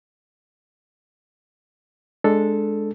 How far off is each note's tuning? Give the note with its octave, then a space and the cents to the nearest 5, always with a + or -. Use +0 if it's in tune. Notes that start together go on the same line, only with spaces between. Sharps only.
G#3 +15 D4 +0 A4 +0